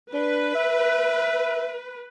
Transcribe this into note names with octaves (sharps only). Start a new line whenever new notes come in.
D4 B4
E5